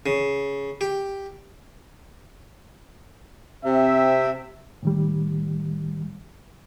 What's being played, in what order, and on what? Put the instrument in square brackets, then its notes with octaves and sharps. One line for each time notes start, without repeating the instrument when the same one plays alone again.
[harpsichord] C#3
G4
[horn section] C3 C4 E5
[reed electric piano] A2 D#3 G3